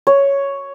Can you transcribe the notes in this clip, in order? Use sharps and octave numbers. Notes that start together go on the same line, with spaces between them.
C#5